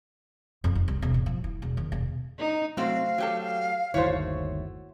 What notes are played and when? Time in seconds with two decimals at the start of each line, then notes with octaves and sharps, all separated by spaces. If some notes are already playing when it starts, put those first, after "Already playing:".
0.64 F2
0.75 D#4
0.88 C2
1.02 E1
1.14 A1
1.26 F3
1.44 E4
1.62 E1
1.77 D#3
1.92 E1
2.39 D#4
2.77 C3 F#3 A3 C4 F#4 C5 F5
3.18 F#3 G4 A4
3.94 G1 D#2 D#3 A3 E4 F#4 C5 C#5